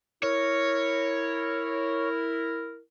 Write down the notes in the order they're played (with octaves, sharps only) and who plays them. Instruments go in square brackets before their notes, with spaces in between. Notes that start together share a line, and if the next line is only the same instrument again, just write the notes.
[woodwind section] E4 A#4 [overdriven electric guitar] C#5